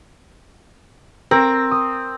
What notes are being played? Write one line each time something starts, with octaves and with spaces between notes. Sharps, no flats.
C4 A#4
D#6